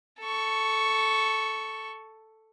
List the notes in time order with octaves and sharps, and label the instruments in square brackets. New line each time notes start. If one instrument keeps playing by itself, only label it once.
[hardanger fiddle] A4 C#6